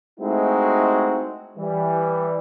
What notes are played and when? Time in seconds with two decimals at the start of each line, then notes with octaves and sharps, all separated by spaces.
0.20 G#3 A3 C4 D#4 E4 F#4
1.58 E3 G3